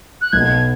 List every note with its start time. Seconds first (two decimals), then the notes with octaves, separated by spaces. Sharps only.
0.21 F#6
0.32 B1 B2 B3 G#6